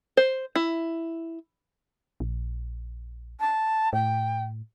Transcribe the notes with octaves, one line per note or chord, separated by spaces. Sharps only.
C5
E4
A#1
A5
A2 G5